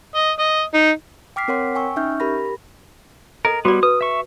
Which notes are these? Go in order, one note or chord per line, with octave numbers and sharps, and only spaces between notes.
D#5
D#5
D#4
G5 D6 F6 B6 C7
C4 A#4 C#5 F#5 C6 B6
G5 G#5 C#6 E6
C#4 D#4 E5 C#6 F6 G6
G4 A#4 B5 A#6
A4 A#4 D#5
G3 B3 F#4 D5
B4 D#6
E5 C#6